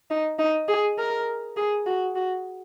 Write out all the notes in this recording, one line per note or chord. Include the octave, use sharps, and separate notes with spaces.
D#4
D#4
G#4
A#4
G#4
F#4
F#4